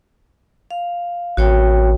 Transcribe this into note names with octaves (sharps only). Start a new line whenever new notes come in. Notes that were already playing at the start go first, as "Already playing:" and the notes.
F5
A1 F#4 C#5 G5